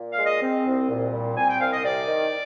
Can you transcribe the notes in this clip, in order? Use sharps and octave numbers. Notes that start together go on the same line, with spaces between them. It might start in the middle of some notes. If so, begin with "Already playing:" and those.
Already playing: A#2
F5
G#3
D#5
C4
C2
A#2
G3
C4 G#5
G5
C2 F5
D#5
C3 D5
D#3